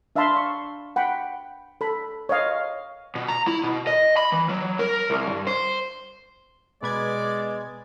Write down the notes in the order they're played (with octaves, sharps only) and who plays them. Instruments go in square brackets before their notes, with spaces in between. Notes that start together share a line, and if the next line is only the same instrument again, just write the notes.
[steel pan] D4 E5 F5 A5 B5 C6
C#6
F#5 G5 B5
A4 B5
C#5 D#5 F5
[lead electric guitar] B2
A#5
E4
B2
D#5
B5
E3
F#3
A#4
C2
G2
C5
[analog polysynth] B2 B4 G#6 [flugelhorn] G#3 [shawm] D5